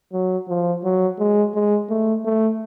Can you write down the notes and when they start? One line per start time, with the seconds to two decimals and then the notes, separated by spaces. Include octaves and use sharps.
0.13 F#3
0.48 F3
0.83 F#3
1.19 G#3
1.54 G#3
1.89 A3
2.25 A3